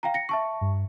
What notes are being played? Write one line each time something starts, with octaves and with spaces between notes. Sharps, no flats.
F5 G5 A#5
A#6 C#7
E5 A5 C#6
G2